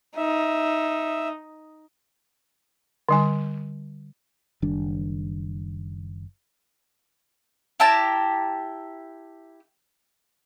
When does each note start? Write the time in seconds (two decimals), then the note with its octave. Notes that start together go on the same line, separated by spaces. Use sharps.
0.17 D#4 E5
3.09 D3 G3 G#5
4.62 F#1 D#3 G3 D4
7.80 E4 G4 A5 A#5